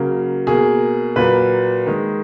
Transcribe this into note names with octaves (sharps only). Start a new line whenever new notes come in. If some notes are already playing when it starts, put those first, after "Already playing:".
Already playing: C#3 F#3 A#3
B2 A#3 G#4
A#2 F#3 A#3 B4
D#3 G#3